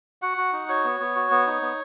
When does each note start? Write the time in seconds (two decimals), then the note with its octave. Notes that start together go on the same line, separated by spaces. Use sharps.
0.22 F#4 F#5
0.38 F#4
0.53 D#4
0.68 F#4 C#5
0.84 B3
1.00 B3
1.16 F#4
1.31 B3
1.47 D#4
1.62 B3